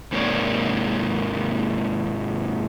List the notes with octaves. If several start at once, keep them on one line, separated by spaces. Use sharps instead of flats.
G#2 C3 A#3 B3 C#5 D5